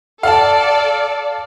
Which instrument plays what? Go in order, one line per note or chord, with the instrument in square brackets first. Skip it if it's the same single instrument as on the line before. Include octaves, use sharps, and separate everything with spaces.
[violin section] A4 D5 [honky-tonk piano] F5 A5